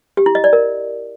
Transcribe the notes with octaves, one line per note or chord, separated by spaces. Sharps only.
G4
E4
D#5
D5
A#4